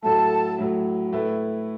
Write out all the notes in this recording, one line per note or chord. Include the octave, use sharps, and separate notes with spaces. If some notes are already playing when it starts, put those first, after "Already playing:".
A2 F#3 A3 A4 A5
A2 F#3 A3
A2 A3 E4 B4